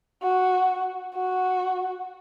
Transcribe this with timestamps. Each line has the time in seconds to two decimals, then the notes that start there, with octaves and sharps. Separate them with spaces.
0.23 F#4
1.15 F#4